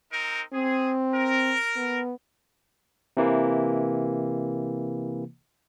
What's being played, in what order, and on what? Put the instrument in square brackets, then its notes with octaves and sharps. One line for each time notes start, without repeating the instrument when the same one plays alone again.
[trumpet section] C4 D#4 A#4
[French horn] C4 [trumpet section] G#4
[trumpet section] A#4
[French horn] B3
[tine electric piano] C3 E3 A#3